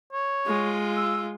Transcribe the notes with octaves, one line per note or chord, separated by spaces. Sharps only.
C#5
G#3 F4
E6